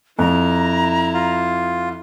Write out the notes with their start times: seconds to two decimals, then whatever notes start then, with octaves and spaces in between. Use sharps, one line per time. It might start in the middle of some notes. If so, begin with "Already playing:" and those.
0.19 F2 E4 A#5
1.14 F4